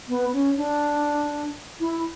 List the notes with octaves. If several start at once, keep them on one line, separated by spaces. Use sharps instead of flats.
B3
C#4
D4
E4